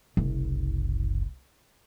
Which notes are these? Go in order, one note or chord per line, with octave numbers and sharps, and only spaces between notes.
F#1 C2